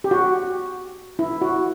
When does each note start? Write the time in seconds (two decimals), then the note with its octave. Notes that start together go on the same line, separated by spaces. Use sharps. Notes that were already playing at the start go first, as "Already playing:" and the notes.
0.04 G4
0.11 F#4
1.19 E4
1.41 F#4